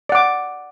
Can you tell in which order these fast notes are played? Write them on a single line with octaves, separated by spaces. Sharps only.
D5 F#5 D6